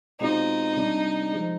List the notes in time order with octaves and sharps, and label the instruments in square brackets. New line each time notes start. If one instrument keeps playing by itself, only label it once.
[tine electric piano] B2 G#3 C4 F4 [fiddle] D#4
[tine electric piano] C3 G3 D4
F3 G#3